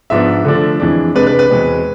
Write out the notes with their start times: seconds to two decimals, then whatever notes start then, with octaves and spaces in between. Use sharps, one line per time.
0.10 G#2 F3 B3 D4 E5
0.45 D3 F3 A3 D4
0.80 F2 E3 G#3 D4
1.15 C3 G#3 D4 B4
1.27 B4
1.39 B4
1.50 E2 B2 G#3 C4